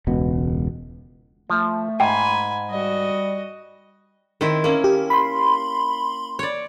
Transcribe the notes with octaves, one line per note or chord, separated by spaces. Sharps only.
E1 C#2 B2 B3
F3 A3 A5
G#2 G5 G#5 B5
G3 F#4 D#5
D#3 C4 E4
A#3 C#4
G4
B5 C6
C#5 D5